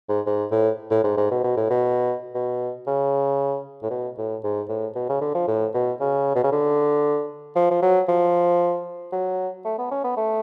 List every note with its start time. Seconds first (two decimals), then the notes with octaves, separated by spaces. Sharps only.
0.09 G#2
0.26 G#2
0.52 A2
0.91 A2
1.04 G#2
1.17 G#2
1.31 B2
1.44 B2
1.57 A2
1.70 B2
2.35 B2
2.87 C#3
3.83 A2
3.91 B2
4.18 A2
4.44 G#2
4.69 A2
4.95 B2
5.09 C#3
5.21 D3
5.35 F3
5.48 A2
5.74 B2
6.00 C#3
6.35 B2
6.43 C#3
6.52 D3
7.56 F3
7.71 F3
7.82 F#3
8.08 F3
9.12 F#3
9.65 A3
9.78 B3
9.91 C#4
10.04 B3
10.16 A3